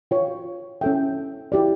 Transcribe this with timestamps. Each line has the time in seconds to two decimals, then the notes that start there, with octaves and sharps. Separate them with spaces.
0.11 F4 C#5 G5
0.81 C#4 E4 A4 E5 G5
1.52 E4 G4 D5